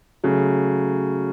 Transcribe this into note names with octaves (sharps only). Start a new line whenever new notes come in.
C#3 F#3 A3